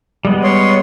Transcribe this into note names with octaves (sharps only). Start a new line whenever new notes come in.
G3 G#3 B3
C#5 C6